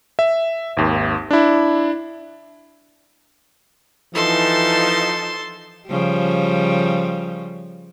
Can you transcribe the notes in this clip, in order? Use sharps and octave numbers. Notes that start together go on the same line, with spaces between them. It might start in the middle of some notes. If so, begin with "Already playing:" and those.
E5
G#1 D#2
D4 E4
E3 F3 D#4 A4 A5 C6
C#3 F3 G3